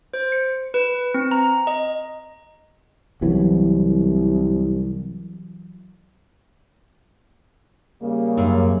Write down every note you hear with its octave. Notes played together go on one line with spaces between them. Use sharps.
C5
C#7
B4
C4
A#5
D#5
C2 E3 F#3 B3
C#3 G3 A#3
F#2